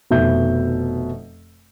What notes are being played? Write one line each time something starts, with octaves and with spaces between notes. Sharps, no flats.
F1 B2 D#3 E5 G6